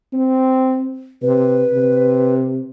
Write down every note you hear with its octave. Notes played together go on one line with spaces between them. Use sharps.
C4
C3 B4
C3